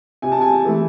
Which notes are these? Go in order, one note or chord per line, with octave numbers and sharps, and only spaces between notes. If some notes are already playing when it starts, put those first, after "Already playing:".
C3 G#5
A5
G#5
E3 A3